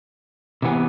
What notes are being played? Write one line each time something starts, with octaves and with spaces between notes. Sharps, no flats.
C3 E3 B3